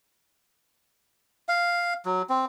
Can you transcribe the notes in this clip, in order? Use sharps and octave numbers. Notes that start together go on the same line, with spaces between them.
F5
F#3
C4